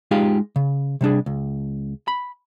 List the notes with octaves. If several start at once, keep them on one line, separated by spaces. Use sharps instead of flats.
G#3 D#4 F4 G4 G#4 F5
C#3
C3 G3 D4 G#4
C#2
B5